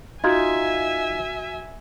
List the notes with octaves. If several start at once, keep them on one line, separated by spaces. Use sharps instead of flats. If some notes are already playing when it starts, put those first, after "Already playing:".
D#4 F4 F#4 E5 G#5 G#6